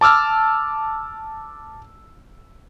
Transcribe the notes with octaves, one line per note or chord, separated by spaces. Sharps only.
A5 D6 E6 F6